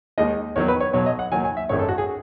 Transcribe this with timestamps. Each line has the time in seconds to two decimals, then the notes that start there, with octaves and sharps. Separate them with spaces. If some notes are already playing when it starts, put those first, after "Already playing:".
0.18 D#2 D#3 G#3 D#5
0.56 E2 D#3 F#3 C#5
0.68 B4
0.80 C#5
0.93 B1 B2 F#3 C#5
1.06 D#5
1.19 F#5
1.32 D#2 D#3 F#3 G#5
1.44 G#5
1.57 E5
1.69 G#1 F#2 D#3 G#3 C#5
1.79 A4
1.89 F#4
1.98 G#4